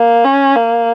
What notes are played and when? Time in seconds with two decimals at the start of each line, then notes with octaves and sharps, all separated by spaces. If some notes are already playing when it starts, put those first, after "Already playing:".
Already playing: A#3
0.24 C#4
0.56 A#3